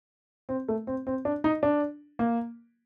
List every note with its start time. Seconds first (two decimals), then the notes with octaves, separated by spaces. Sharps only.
0.49 C4
0.68 A3
0.87 C4
1.07 C4
1.25 D4
1.44 D#4
1.63 D4
2.19 A#3